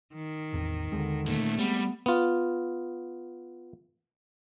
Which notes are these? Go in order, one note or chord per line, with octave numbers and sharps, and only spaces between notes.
D#3
A1 E2 C4
D#2 D3 G#3 C4
A#2 D#3 A3
G3 G#3 B3 C4
B3 F4